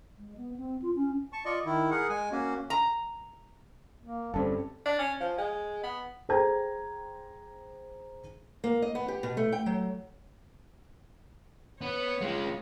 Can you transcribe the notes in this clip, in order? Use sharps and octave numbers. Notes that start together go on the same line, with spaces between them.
G#3
B3
C4
F4
C#4
A5 C#6
F4 D5 D#5 C#6
D#3 E4
G#4 A#4 F#5
G#3 G#5
A#3 C#4 F#4
A#5
A#3
G1 G2 G3 C4 C#4 A4
D4
C#4
F3
G#3
B3
G#4 C5 G5 A#5 G#6
A#3
D#5
B3
G4
B2
A3
G5
F#3
B3 C#5
G#3 F4